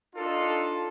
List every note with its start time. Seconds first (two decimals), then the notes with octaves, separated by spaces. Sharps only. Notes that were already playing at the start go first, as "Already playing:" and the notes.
0.16 D4 D#4 F4 A4